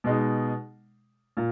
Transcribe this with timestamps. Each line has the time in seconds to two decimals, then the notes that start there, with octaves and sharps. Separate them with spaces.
0.04 B2 G#3 D#4
1.37 A#2